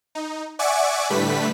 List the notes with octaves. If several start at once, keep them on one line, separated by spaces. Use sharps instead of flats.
D#4
D5 E5 F#5 G#5 C#6 D6
A2 D3 G3 A3 B4 B6